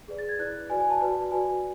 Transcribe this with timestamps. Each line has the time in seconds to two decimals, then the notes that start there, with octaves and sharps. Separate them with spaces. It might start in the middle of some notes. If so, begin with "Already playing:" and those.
0.08 G#4 B4 D5
0.19 A6
0.29 G#6
0.39 E4 B4 D5 F#6
0.70 F#4 B4 D5 G#5
0.80 G#5
0.90 A5
1.00 F#4 B4 D5
1.31 F#4 B4 D5 G#5